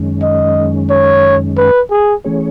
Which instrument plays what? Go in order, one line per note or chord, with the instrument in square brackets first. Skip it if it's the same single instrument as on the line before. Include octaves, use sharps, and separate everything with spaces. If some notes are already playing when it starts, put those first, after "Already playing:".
Already playing: [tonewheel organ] F#2 D#3 G#3 C#4
[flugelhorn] D#5
C#5
B4
G#4
[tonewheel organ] E3 A3 C#4 G#4 C#5